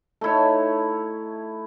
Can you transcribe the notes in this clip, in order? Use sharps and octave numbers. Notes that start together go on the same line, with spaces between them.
A3 D#4 E4 C#5